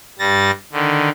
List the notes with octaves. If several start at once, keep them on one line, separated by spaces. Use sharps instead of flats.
G2 G3 A6 A#6
D3 D#3